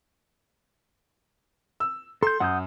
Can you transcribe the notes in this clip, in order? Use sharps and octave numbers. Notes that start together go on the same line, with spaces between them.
E6
A4 C6 G6
F#2 F#5 D#6 G6